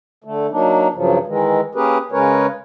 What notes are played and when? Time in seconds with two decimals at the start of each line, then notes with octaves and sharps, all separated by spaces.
0.24 D3 A3
0.51 F#3 A#3 D4 D#4
0.93 G2 C#3 F3 F#3
1.26 D#3 E3 G#3
1.75 A#3 C#4 G4 G#4 A#4 B4
2.12 C#3 G#3 C#4 A#4 B4 C#5